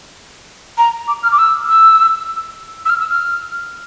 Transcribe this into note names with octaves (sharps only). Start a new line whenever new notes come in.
A#5
D6
F6
D6
E6
E6
E6
F6
E6
F6